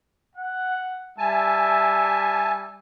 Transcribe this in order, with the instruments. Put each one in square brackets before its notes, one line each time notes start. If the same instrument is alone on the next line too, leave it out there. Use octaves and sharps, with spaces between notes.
[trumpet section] F#5
[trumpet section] G3 E5 [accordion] G#5 A5